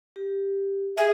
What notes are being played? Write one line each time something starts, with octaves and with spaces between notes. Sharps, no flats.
G4
G#4 E5